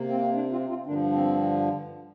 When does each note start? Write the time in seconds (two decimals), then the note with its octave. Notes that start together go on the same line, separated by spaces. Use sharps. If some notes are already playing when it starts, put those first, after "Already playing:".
Already playing: C3 A#3
0.09 C4
0.34 A#3 D4
0.51 C4 F4
0.69 C4 F4
0.86 G2 D3 F3 A#3 D4
1.12 C4